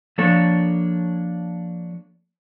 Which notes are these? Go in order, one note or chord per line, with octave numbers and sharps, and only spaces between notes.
F3 A#3 D4 A4 C#5